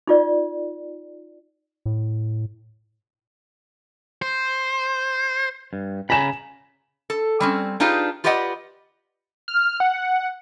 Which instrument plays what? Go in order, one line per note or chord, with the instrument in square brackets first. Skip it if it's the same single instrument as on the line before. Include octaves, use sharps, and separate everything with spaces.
[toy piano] D#4 F4 D5
[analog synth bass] A2
[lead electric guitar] C5
[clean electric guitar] G2
[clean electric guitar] C#3 A#5 B5 [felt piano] G#5 E7
[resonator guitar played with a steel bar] A4
G3 C4 C#4
D4 D#4 F4 G4 G#4 B4
F4 G4 B4 D5 D#5 F#5
[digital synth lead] F6
F#5